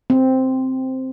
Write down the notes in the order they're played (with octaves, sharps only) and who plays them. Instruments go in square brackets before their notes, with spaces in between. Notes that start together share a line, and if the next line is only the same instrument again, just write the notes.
[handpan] C4